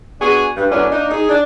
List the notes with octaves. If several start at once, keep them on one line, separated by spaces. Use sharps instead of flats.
B3 D4 F#4 G#4
G2
F#2 A2 B3 C#4 D4
A#3 D4 D#4
D#4 G#4
D4